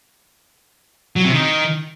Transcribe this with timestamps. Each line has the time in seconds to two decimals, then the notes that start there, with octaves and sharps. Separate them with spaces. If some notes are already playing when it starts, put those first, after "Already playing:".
1.16 F#3
1.25 C3
1.34 D#3